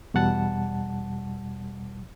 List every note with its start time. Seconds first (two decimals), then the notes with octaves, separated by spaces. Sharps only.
0.14 E2 B2 G3 F#5 A5